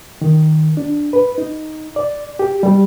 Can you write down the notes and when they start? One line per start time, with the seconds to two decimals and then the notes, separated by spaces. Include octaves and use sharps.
0.22 D#3
0.77 D4
1.13 B4
1.38 D#4
1.96 D5
2.39 G4
2.63 G3